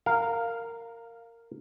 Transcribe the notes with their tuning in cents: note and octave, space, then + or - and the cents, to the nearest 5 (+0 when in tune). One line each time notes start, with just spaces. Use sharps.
A#4 -15 F5 +0